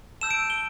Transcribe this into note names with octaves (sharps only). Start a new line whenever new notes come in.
A5 E6 G6 E7
D7
G7